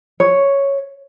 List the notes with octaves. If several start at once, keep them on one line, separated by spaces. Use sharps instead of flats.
C#5